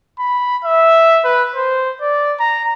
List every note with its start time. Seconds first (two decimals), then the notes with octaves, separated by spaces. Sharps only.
0.19 B5
0.65 E5
1.25 B4
1.55 C5
2.01 D5
2.40 A#5